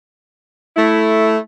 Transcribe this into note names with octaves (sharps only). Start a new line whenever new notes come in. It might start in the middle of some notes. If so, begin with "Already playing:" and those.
A3 E4